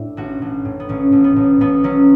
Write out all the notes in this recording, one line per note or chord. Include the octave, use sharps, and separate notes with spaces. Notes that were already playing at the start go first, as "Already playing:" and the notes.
Already playing: A2 D4 E4
A1 F#4
A1
A2
B3
A1 C#4
A1
B3
A1
A1 B3
F#3 C#4